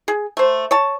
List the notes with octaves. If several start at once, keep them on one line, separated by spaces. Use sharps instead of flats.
G#4
A3 C5
C#5 A5